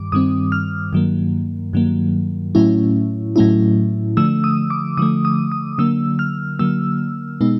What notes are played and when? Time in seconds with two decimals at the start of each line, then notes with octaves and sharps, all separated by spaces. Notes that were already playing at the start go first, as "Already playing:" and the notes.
Already playing: G2 D#3 G3 D6
0.12 G2 D#3 G3 C4 D#6
0.52 F6
0.93 G2 D#3 F#3 A#3
1.73 G2 D#3 F#3 A#3
2.55 A2 F#3 A3 C#4 E4
3.36 A2 F#3 A3 C#4 E4
4.17 D3 F3 A3 E6
4.44 D#6
4.70 D6
4.97 D3 F3 A3 D#6
5.25 D#6
5.52 D#6
5.78 D3 F#3 A#3 E6
6.19 F6
6.59 D3 F#3 A#3 E6
7.41 B2 G#3 B3 D#4